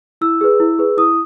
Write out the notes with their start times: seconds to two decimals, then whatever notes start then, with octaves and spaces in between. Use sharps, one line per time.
0.21 E4 E6
0.41 G#4 B4
0.60 E4
0.79 G#4 B4
0.97 E4 D#6